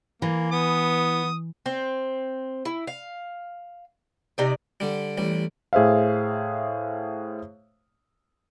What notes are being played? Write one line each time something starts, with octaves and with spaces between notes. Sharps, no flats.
E3 A#3
B3 D#6
C4
E4
F5
C3 D#4 D5
D3 G3
A1 G3
A2 G#4 C5 E5 F5